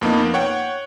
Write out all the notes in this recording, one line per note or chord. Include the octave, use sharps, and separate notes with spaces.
F2 A#3 B3 D#4
C#5 F#5 G5